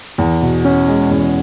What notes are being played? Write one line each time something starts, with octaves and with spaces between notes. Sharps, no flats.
E2
B2
C#4
G#3
E2